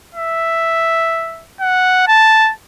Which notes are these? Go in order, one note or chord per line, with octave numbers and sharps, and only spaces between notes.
E5
F#5
A5